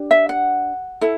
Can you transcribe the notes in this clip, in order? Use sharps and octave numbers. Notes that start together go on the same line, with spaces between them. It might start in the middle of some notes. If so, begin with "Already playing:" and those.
Already playing: D4 G4
E5
F#5
E4 A4